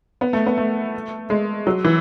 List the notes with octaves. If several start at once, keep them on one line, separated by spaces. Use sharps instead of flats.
B3
A3
B3
A3
G#3
F#3
E3